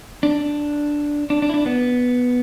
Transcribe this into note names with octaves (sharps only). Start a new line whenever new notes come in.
D4
D4
D4
E4
D4
B3